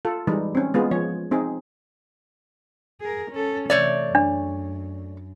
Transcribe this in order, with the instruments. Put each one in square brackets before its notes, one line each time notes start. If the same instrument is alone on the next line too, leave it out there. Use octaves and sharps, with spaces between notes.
[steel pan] F4 A4
E3 G3 G#3 D#4
C4 C#4
G#3 B3 F4 G#4
F3 C#5
C4 D#4 G#4
[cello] G#4 A#4
C#4 A4
[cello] C3 E3 [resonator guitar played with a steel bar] A3 C#5 D5
[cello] F#2 [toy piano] D4